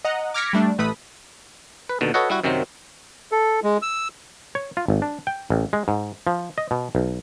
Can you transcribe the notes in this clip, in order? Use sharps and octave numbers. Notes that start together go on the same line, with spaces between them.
D#5 F#5 A#5
D6 F6 G#6 A#6 B6 C#7
G3 A3 D4
A1 A3 B4 B5 D#6
B4
D#2 B2 D3
F#4 A4 B4 C#5 D#5 F#5
G3 E4 F#4
F#2 C3 D#3 F#3 C4
A4
G#3
E6
C#5
F4
G#1
D4
G5
A1
G#3
G#2
F3
D#5
B2
B1